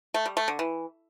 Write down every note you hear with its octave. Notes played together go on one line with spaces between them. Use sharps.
A3
G3
A3
D3
E3